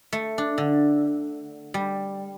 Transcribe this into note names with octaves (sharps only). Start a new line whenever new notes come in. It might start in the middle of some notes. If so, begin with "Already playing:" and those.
A3
D4
D3
G3